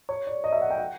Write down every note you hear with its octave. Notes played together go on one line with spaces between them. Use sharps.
C#5
D5
D#5
E5
F#5
G5
F#5